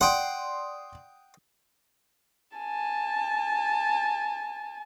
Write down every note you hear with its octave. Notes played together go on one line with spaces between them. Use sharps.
D5 F#5 G5 C6 D#6
G#5 A5